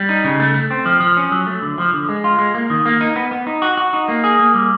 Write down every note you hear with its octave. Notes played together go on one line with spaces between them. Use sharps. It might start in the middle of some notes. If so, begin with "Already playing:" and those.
Already playing: G3
D#4
C#3
A3
A3
C4
F3
F3
C#4
F#3
A3
D3
F3
D3
G#3
F4
G#3
A#3
D#3
A#3
D#4
B3
B3
D#4
F#4
F#4
D#4
A#3
G#4
A#3
G3